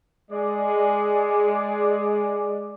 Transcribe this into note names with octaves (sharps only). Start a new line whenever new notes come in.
G#3 D5